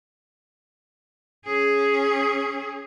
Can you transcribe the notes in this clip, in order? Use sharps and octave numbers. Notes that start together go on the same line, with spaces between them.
C#4 G#4